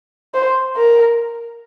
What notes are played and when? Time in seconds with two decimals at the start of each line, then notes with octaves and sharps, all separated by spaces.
0.34 C5
0.77 A#4